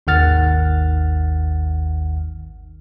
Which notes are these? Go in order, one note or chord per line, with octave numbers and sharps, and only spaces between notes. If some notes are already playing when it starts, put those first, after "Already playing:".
G#1 D#2 D#3 F#5 F6 A6